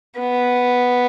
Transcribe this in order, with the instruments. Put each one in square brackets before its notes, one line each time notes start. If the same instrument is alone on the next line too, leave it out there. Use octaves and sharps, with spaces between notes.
[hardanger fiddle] B3